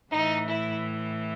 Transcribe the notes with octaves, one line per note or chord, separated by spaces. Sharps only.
A2 E3 D#4
E4